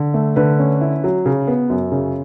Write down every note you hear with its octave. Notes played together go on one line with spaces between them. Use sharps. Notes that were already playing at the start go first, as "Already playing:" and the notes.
Already playing: D3
A3
D3 B4
C#4
E4
F#3
C#3
B3
F#2
C#3